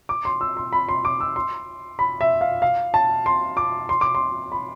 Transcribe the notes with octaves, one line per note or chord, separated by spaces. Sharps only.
D6
C6
E6
C6
B5
C6
D6
E6
C6
B5
E5
F5
F5
A5
C6
D6
C6
D6
C6
B5